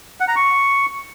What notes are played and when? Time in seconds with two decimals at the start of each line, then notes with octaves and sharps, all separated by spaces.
0.20 F#5
0.28 A#5
0.36 C#6